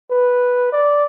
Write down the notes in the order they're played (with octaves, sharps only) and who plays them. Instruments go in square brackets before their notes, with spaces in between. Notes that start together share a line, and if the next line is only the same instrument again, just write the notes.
[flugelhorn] B4
D5